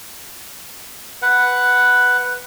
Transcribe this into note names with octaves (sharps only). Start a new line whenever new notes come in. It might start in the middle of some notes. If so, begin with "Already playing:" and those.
B4 F#5